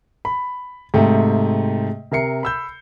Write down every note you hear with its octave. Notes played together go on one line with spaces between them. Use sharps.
B5
G#2 C3 A3 G5
C3 A#4 E5 C7 C#7
B5 E6 G6